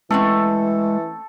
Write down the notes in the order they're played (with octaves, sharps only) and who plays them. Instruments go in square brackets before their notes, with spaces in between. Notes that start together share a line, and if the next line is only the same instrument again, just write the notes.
[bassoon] E3 [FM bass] G#3 [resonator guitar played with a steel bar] A3 C4 C#4 [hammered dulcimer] A4